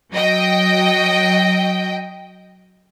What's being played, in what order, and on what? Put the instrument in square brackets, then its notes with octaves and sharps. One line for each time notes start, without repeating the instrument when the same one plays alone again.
[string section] F#3 D#5 G5